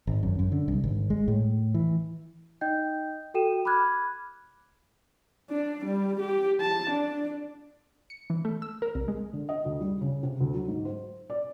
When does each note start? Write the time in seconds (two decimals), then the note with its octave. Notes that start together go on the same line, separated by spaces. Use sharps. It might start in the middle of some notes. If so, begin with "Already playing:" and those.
0.07 G#1
0.23 F#2
0.39 F#2
0.52 D3
0.68 C2
0.84 G#1
1.10 G#3
1.28 A2
1.74 E3
2.61 D#4 D#5 G5 G6
3.34 F#4 A4 G5 D#7 E7
3.65 B5 D6 F6 F#6 G#6
5.50 D4
5.85 G3
6.20 G4
6.61 A5
6.91 D4
8.10 C#7
8.30 E3
8.45 A3
8.62 E6
8.82 A#4
8.95 C2
9.08 G#3
9.33 D3
9.49 D#5
9.65 D2
9.81 G3
10.01 C#3
10.23 C3
10.41 D2
10.54 F#3
10.68 G#2
10.85 C5
11.30 D5